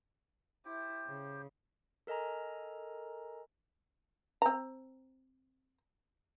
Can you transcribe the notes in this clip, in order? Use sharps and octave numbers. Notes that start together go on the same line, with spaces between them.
E4 G4 C5 G5
C#3
A4 A#4 D#5 G#5 A#5
C4 A#5